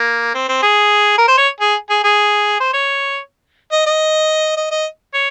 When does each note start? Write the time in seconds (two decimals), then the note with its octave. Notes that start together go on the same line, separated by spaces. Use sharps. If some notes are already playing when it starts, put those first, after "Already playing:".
Already playing: A#3
0.34 C4
0.48 C4
0.62 G#4
1.18 A#4
1.28 C5
1.38 C#5
1.60 G#4
1.90 G#4
2.04 G#4
2.60 C5
2.73 C#5
3.72 D#5
3.86 D#5
4.57 D#5
4.71 D#5
5.14 C#5